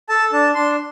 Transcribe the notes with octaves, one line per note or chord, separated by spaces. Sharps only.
A4 A5
D4 A5
D4 C6